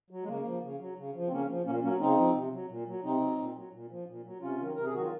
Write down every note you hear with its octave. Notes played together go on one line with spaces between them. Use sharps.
F#3
G#3
C#3 A#3
F3
C#3
F#3
C#3
F3
C4
C#3 A#3 C#4
F3
A#2 A#3 C#4
F#3 A#3 C#4
C#3 C4 D#4
F3
C3
F#3
A#2
F#3
C3 C4 D#4
F#3
A#2
F#3
A#2
F3
A#2
F#3
C3 C#4 F4
D#3 F#3
C3 A#4
G#4
D#3 F#3 F#4
F4